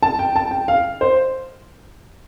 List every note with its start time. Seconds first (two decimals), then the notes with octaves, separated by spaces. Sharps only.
0.03 A5
0.19 G5
0.36 A5
0.51 G5
0.68 F5
1.01 C5